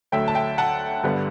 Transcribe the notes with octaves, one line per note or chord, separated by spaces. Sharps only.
D2 D3 F#3 A3 E5 G5
A5
E5 G5
F#5 A5
G1 G2 D3 G3 B3